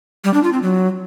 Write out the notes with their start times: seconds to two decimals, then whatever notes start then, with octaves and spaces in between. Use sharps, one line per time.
0.24 G3
0.34 D4
0.43 F4
0.53 C4
0.62 F#3